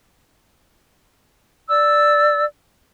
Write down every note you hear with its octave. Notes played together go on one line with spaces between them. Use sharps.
D5 E6